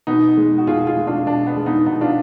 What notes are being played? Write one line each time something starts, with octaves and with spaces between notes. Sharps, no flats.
B2 B3 D#4
G#3
F#4
B2 F4 G#4
F4 G#4
G#3
D4 F4
B2 D4
B3
G#3
B3 D#4
B2 B3 D#4
D4 F4